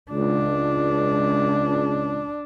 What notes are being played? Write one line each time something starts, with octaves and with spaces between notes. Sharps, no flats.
C#2 D4